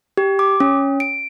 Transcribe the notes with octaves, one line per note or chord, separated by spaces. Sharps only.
G4
D6
C#4
D7